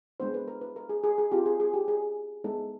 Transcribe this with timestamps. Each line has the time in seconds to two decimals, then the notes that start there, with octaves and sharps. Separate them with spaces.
0.20 G#3 B3 D4 C5
0.34 B4
0.48 A#4
0.61 B4
0.76 A#4
0.89 G#4
1.03 G#4
1.18 G#4
1.32 C4 F4 G4
1.46 G#4
1.60 G#4
1.74 G4
1.88 G#4
2.44 G#3 B3 D#4 A4